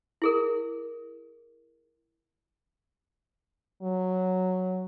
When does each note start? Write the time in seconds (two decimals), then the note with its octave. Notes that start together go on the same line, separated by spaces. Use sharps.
0.22 E4 G#4 A#4
3.82 F#3